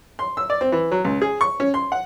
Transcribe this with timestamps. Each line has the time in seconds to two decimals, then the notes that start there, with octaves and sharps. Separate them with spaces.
0.19 C6
0.37 E6
0.50 D5
0.61 C4
0.72 E3
0.92 F#3
1.04 C#2
1.22 G#4
1.41 C#6
1.60 C#4
1.74 C6
1.92 F#5